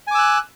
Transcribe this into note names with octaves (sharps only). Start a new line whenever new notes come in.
G#5 D6 E6 F#6